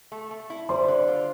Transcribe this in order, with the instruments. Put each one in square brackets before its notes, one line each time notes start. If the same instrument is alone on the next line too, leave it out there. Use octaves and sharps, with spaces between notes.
[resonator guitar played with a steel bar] A3
A3
E4
[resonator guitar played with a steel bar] G3 [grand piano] C5 C6
[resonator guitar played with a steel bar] D3
F4